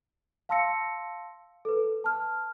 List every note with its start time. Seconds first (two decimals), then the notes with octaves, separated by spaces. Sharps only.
0.49 F5 A5 C6 E6 A#6 C#7
1.65 A4 B4
2.04 A5 F6